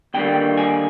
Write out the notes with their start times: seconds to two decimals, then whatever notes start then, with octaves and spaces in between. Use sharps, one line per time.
0.14 D#2 D3 G3 A#3 G5
0.57 G#5